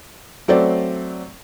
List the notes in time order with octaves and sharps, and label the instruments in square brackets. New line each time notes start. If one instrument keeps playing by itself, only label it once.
[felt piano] F#3 A3 C4 C5 D5